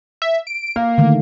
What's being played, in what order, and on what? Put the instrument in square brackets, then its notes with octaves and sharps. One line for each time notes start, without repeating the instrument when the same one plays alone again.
[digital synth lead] E5
D7
[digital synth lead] A#3 [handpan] F5
[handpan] D3 D#3 A3